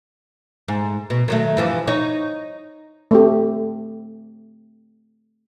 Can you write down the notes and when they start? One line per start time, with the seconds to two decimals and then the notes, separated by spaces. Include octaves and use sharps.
0.68 G#2
1.10 B2
1.28 D#3 F#3 A3
1.57 G2 E3 F3
1.87 D#4 C#5
3.11 A3 C4 G4